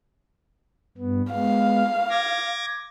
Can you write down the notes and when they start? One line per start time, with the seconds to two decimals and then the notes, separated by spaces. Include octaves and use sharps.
0.98 G2 B3
1.32 G#3 B3 F5
2.10 D6 G#6 A#6